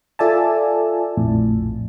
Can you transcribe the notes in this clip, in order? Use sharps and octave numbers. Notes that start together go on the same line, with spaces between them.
F4 A4 D5 E5 G#5 A5
A#1 F2 A2